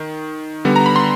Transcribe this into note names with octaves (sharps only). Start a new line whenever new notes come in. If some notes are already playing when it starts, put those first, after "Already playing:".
Already playing: D#3
D3 G3 B3
A#5
B5
C6